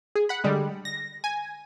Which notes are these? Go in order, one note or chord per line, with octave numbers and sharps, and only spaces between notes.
G#4
F#5 B5
D3 G3 G#3
A#6
G#5